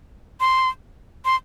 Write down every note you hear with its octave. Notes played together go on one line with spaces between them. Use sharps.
C6
C6